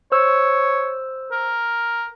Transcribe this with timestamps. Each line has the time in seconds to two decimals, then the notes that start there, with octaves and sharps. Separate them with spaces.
0.12 C5 C#5 E6
1.31 A#4